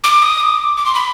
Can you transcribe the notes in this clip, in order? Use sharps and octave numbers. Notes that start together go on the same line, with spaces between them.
D6
D#6
D6
D6
C6
B5